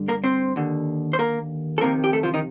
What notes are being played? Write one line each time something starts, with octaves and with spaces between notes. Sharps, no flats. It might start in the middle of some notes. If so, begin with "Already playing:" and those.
Already playing: G2 D3
A#3 A#4
C4 C5
D#2 D3
C5
A#3 A#4
A4
F2 C3 D#3 A#3 A#4
G4
A3 A4
F3 F4
D#3 D#4